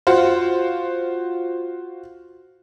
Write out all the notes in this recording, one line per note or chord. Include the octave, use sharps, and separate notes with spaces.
F4 F#4 C5